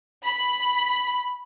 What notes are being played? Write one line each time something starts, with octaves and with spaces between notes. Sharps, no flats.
B5